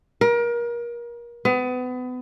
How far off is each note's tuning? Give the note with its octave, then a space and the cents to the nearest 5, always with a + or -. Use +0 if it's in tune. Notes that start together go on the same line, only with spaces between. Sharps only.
A#4 +30
B3 +30